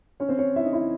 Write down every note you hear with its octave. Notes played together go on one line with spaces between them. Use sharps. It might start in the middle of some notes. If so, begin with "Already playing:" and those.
C#4 C#5
C4 C5
C#4 C#5
E4 E5
D#4 D#5
E4 E5